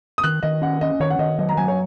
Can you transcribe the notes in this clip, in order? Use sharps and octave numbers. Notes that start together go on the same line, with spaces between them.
D#6
D#3 F#6
D#3 D#5
C#4 F#5
C#4 D#5
D#3 C#5
F#5
D#3 D#5
F#3 D#5
A#5
F#3 G#5
C#5